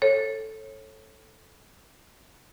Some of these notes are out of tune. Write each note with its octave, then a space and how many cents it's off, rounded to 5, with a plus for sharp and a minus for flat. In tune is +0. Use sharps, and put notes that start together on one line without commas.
A4 +0 C#5 -25